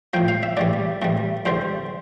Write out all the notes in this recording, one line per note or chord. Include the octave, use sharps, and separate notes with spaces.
A2 F3 G5
F5
E5
A2 E3 G3 D5
A2 E3 G3
E2 D3 G3 C5